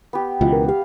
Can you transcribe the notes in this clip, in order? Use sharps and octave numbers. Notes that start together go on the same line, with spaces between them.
B3 G4
C#2 B2 E3 F4
A#4
G4 F5